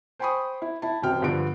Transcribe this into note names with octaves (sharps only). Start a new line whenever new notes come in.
C5 G5 G#5 B5 C#6 D#6
E4
E4 A5
D#1 F#2 C3 F#3 G5 F6
G2 D3 F3 B3 D7